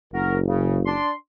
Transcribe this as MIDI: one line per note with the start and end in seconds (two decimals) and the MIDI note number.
0.14 0.98 30
0.14 0.37 66
0.14 0.37 70
0.47 0.78 49
0.86 1.11 62
0.86 1.11 74
0.86 1.11 84